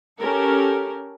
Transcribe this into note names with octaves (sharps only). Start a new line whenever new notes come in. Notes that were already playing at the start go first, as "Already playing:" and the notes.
C#4 G4 A4 A#4